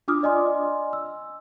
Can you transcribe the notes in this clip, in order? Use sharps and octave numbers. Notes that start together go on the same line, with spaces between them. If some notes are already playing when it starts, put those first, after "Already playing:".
D4 F4 D6 D#6 F6
D5 D#5 G#5 C6
E6